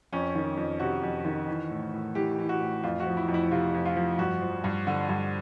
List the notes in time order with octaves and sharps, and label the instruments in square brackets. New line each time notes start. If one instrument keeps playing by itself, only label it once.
[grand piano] F2 C#4
D#3
F2
C3 F#4
F2
D#3
E3
A2
A2
E3 G4
E3
F#4
A2
F2 F4
F#4
F3
E4
F2
E4
C3 F4
F2
F4
F3
G2 F#4
F3
G2
D3
G2